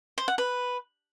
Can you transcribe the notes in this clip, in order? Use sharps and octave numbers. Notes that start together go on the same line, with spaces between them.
C5
F#5
B4